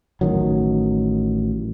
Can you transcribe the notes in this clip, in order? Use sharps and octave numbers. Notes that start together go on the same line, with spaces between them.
A1 D#3 F#3